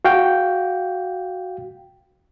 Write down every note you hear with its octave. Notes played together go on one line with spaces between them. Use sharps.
F#4 F5 G5